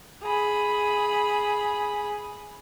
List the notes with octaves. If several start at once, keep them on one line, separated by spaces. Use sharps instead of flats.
G#4 B5